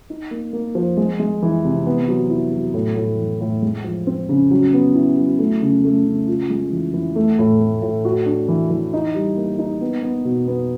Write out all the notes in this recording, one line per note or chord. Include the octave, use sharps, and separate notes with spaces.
D#4
A#3
A#3
F3
G#3
G#3
E3
C3
B3
F#3
E4
F#3
A2
A2
E3
A2
G#3
F3
C4
C#3
F#3
B3
E4
F#3
A3
C#3
A3
C#3
F4
G#3
E3
E3
A3
A2
A3
A2
F#4
D4
E3
E3
D#4
G3
A#3
D#4
B3
B3
B2
B3